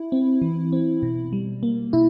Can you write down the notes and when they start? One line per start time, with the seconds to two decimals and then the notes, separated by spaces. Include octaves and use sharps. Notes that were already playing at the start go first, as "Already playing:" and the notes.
Already playing: E4
0.12 C4
0.42 E3
0.72 C4
1.03 B2
1.33 G3
1.63 A#3
1.93 B2 E4